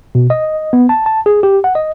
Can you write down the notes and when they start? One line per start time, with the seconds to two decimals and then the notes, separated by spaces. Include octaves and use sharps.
0.15 B2
0.30 D#5
0.73 B3
0.89 A5
1.06 A5
1.26 G#4
1.43 G4
1.64 F#5
1.75 D#5